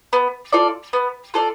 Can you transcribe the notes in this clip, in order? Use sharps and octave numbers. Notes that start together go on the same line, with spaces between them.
B3
F4 A4 D5
B3
F4 A4 D5